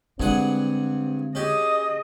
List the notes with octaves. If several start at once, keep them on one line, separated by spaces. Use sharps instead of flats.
G2 D3 G#3 C4 G#4 F#5
C#4 G4 G#4 D#5